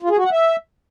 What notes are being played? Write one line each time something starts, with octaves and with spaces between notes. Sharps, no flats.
F4
G#4
F#4
F#5
E5